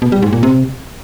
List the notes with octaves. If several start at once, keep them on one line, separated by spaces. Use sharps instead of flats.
B2
G3
G#2
A#2
C3